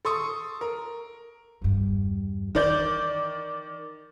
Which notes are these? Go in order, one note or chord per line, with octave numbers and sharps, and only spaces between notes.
A4 C6 C#6 D#6
A#4
E2 G2
D#3 E3 D5 G6